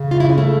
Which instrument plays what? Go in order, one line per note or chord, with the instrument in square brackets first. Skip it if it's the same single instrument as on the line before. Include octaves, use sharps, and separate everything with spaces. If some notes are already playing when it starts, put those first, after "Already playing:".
Already playing: [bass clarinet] C#3
[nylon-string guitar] F4
E4
C#4
A3